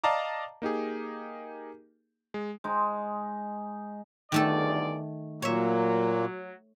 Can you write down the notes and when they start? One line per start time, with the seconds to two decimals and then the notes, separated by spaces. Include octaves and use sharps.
0.04 D5 D#5 F5 A5 A#5 D6
0.62 A#3 D#4 G4 G#4
2.34 G#3
2.64 G#3 D#4
4.32 G1 E2 D#3 A3 A4 D5
5.42 A#2 F#3 A#3 C#5 E5